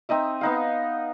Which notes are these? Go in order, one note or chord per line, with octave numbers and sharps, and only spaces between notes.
C4 D#4 D#5 E5
B3 D#4 F5